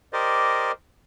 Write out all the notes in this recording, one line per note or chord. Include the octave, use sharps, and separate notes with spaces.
G4 A#4 C5 D5 D#5